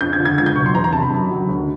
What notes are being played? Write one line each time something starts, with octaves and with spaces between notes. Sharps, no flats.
F2 G6
G#6
D3 F3
G#6
C#2 G#6
G6
B2 F#3 C#6
C6
E2 A#5
A#5
C3 D#3 A5
B5
F#2
D#3 F#3
D2